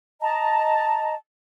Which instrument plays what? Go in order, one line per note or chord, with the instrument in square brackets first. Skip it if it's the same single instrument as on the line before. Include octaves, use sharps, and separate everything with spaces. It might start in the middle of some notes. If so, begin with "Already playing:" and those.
[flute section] D#5 A5 A#5